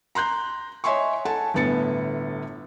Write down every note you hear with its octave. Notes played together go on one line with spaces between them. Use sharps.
A#5 C6 F#6 G6
C#5 D#5 E5 G#5 C6 C#6
A4 F#5 G#5 A5
G1 A2 B3 A6 C#7